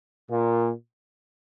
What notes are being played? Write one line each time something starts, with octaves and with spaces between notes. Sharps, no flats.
A#2